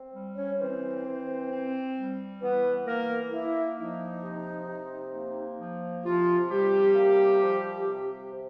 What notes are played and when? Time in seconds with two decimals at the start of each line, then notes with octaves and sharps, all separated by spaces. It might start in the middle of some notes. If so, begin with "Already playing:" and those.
Already playing: C4
0.14 G3
0.36 C#4 C#5
0.59 E3 C4 C5
1.05 E3
1.50 C4
1.95 G3
2.40 E3 B3 B4
2.86 E3 A#3 A#4
3.31 A#3 E4
3.77 F3 D#4
4.22 C3
4.67 C3
5.13 A#3
5.58 F3
6.03 C3 F3 F4
6.49 C3 G3 G4
6.94 A#3
7.41 F3
7.86 C3
8.31 C3